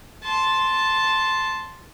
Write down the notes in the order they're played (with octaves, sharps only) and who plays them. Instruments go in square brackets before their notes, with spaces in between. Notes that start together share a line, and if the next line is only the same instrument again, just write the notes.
[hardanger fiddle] A5 C6